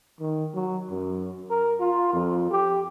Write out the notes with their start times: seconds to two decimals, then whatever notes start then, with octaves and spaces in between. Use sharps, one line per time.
0.20 D#3
0.54 F#3
0.90 F#2
1.50 A#4
1.80 F4
2.14 F2
2.51 G4